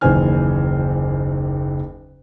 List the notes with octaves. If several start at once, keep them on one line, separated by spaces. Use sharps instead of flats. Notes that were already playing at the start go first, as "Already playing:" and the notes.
F#1 D#2 E3 C5 G#5 F6